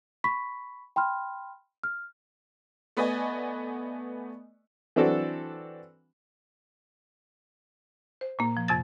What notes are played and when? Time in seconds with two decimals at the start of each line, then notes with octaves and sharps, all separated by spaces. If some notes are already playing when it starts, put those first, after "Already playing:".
0.24 B5 C#6 B6
0.96 G5 B5 C6 F6
1.83 F6
2.97 A3 B3 B4 D5 D#5 G#5
4.96 E3 C4 D4 F#4 A4
8.21 C5
8.39 A#2 A#3
8.57 F3
8.68 F2 C3 A6